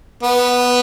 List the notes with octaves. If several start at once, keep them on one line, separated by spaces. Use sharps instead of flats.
B3